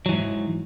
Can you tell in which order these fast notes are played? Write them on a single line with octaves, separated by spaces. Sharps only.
F#3 E3 G#2